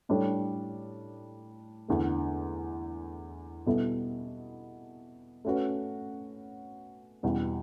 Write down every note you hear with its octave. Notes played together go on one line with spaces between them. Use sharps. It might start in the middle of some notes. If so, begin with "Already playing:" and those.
A2 G3 D4 A4 C#5
E2 D3 A3
B2 G3 B3 E4 A4
A3 C#4 F#4 B4
E2 B2 G3 B3